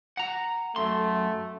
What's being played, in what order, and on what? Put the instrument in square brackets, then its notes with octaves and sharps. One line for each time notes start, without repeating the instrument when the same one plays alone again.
[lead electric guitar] F#5 A#5
[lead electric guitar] F#2 C6 [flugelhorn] A3